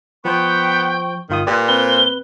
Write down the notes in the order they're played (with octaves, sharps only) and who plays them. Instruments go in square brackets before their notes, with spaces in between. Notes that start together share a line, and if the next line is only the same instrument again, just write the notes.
[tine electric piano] F3 C5 [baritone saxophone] B3 [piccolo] G5 [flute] C#6
[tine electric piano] G1 F4 D#6 [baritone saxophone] D#3
[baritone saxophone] A#2 [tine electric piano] G4 B4 D5
[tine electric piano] C4 B4 [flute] C5 [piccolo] G7